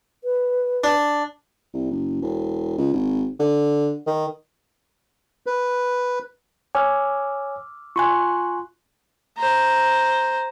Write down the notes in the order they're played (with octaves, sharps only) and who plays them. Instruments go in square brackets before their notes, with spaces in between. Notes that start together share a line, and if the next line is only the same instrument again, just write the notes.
[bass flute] B4
[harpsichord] D4
[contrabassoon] C2
F#1
E1
C#2
G#1
D3
D#3
[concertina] B4
[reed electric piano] C#5 G#5 [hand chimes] D6 E6 F6
[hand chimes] F4 C6 F#6 [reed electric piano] G#5 C#6
[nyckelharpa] C5 A#5